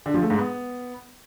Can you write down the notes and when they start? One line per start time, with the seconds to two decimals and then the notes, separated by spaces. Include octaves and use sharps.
0.06 D3
0.14 F3
0.22 A3
0.30 G#2
0.38 B3